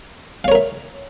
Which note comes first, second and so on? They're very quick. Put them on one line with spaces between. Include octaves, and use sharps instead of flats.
F5 C#5 A#4 E5